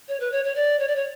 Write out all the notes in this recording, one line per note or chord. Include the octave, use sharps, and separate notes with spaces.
C#5
B4
C#5
C#5
D5
C#5
D5
C#5